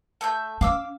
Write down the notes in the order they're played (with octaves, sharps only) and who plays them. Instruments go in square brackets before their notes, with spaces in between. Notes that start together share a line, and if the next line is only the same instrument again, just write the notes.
[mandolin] A3 E5 G6
[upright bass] C#4 [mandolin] F5 D6 E6